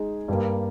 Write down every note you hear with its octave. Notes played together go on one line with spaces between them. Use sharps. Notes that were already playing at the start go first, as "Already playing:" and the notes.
Already playing: G#3 D#4 G#4
G2 G3 A#3